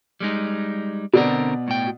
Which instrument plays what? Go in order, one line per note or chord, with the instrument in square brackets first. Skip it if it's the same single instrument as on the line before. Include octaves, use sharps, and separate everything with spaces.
[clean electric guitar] G3 G#3 D#4
[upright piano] B2 D5 [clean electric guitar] D3 C4 A#4
[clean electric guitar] A2 G5